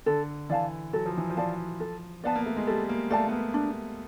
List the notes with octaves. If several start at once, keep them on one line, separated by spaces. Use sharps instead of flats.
D3 A4
E3 D5 F5 A5
F#3 A4
F3
E3
F3
D5 F5 A5
A4
B3 D5 F5 A5
A#3
A3
G#3
G3 A4
A#3
A3 D5 F5 A5
B3
A#3
D4